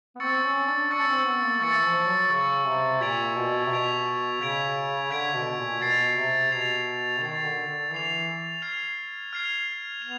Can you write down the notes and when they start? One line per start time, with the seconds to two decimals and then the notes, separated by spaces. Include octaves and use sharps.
0.16 B3
0.20 C4 C#6 E6 A6 C#7
0.44 C#4
0.67 D4
0.91 D4 C#6 E6 A6 C#7
1.00 C#4
1.08 C4
1.25 B3
1.43 A#3
1.60 E3 C#6 E6 A6 C#7
1.84 F3
2.07 F#3
2.31 C#3 C#6 E6 A6 C#7
2.65 C3
3.01 A#2 G#6 B6 D7 F7
3.36 B2
3.66 C3
3.70 B2 G#6 B6 D7 F7
4.41 C#3 G#6 B6 D7 F7
5.11 D3 G#6 B6 D7 F7
5.35 B2
5.58 A#2
5.81 B2 A6 C7 F7
6.16 C3
6.52 B2 A6 C7 F7
7.21 D#3 A6 C7 F7
7.39 D#3
7.45 D3
7.68 D3
7.91 E3 A6 C7 F7
8.62 F6 G#6 C7 F7
9.33 F6 G#6 C7 F7
10.02 B3 F7